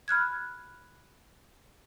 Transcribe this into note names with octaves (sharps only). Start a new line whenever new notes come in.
B5 F6 F#6 G#6